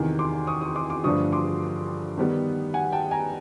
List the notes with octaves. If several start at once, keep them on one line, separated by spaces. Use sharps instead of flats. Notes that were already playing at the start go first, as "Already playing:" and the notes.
Already playing: E2 C3 D#3
C6 D6
C#6 D#6
C#6 D#6
C6 D6
C6 D6
G2 D3 F3 A3 D4 C#6 D#6
C6 D6
D#3 G3 B3
F#5 G#5
G5 A5
G#5 A#5